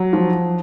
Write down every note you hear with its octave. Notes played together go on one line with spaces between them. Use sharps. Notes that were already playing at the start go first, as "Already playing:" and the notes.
Already playing: F#3
F3